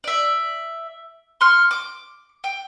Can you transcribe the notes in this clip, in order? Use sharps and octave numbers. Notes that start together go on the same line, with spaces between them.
D5 E5
C6 C#6 F6
D6
G5